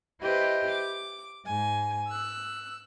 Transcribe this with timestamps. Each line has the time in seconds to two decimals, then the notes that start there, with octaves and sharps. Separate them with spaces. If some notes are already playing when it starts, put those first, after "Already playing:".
0.21 E4 G4 B4 C5 D#5
0.69 D6
1.45 G#2 G#5
2.08 E6 F#6